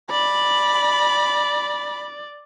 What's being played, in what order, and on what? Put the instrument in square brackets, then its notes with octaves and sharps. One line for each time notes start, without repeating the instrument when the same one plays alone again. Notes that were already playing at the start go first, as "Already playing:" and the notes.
[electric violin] D5 [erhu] B5